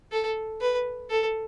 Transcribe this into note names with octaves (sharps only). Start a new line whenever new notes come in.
A4
B4
A4